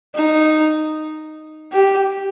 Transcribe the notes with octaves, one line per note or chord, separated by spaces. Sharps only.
D#4
G4